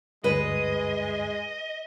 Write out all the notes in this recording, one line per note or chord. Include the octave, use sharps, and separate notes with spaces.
D2 G2 G#3 B4 D#5